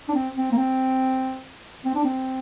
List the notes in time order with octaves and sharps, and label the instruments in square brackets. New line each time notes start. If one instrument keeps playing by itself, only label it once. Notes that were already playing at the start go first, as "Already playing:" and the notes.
[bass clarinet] D4
C4
C4
A#3
C4
C4
D4
C4